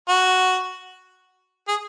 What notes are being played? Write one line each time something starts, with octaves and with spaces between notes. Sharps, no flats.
F#4
G#4